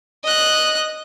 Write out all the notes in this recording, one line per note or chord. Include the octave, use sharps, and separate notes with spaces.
D#5 F#6